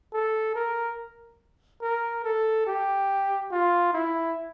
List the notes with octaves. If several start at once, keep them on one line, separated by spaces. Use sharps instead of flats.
A4
A#4
A#4
A4
G4
F4
E4